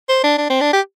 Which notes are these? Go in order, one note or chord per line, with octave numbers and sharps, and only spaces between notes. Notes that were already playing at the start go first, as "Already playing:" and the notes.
C5
D4
D4
C4
D4
G4